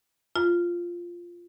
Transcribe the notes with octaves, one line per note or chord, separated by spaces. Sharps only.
F4